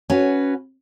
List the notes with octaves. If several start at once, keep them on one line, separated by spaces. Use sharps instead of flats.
C#4 F#4 B4